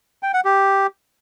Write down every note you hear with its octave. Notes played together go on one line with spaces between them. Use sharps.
G5
F#5
G4